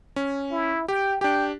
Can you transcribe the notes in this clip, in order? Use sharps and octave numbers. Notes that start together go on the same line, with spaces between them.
C#4
E4
G4 G5
D4 G4 G5